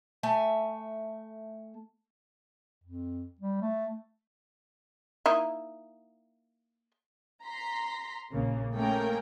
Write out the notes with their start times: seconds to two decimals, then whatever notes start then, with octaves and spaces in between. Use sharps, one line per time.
0.23 A3 E5 G#5
2.84 F2
3.40 G3
3.61 A3
5.26 A#3 D#4 E4
7.44 A#5 C6 B6
8.33 A#1 C#3 A#3
8.74 A3 A#3 C#4 G#4 A#4 G5